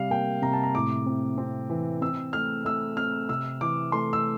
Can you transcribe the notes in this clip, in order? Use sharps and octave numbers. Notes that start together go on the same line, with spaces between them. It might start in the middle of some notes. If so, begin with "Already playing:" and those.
Already playing: C3 G3 F5
A#3 G5
C3 A#5
A5
A#5
A2 D6
C4
C4
E3
C4 E6
A3 F6
A3 E6
C4 F6
C3 E6
E3 D6
A3 C6
E6